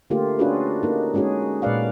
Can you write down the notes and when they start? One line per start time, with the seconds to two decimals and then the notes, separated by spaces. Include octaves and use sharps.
0.10 D3 A3 A#3 F4 G4
0.39 C#4 D4 F4 F#4 G#4 B4
0.83 A#3 D#4
1.14 G#3 C#4 D#4 F#4 G#4
1.62 A#2 G#3 B4 D5 F5 F#5